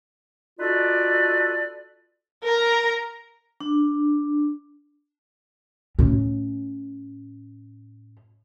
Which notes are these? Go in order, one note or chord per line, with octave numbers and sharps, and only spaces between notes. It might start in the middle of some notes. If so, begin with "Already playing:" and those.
D#4 F4 F#4 A4 B4 D5
A#4 A#5
D4
A2 C#4